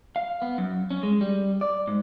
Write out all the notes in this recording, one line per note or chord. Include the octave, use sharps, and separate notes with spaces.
F5
B3
F#2
C#4
G#3
G3
D5
G#2